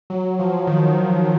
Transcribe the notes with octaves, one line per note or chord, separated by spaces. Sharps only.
F#3
F3
D#3